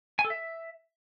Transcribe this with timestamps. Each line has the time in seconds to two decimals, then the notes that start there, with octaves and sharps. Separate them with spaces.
0.19 G#5
0.25 A4
0.30 E5